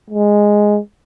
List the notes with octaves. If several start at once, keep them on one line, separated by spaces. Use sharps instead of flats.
G#3